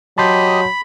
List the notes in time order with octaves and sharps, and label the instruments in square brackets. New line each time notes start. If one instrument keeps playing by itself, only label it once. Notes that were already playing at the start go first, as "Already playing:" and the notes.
[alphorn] F#3 [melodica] G4 D#5 D#6 [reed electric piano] A5 C6 G6 [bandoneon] B5